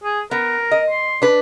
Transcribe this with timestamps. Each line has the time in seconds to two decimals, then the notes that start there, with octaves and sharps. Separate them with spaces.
0.04 G#4
0.31 B3 A#4
0.71 D#5
0.90 C6
1.22 D4 B4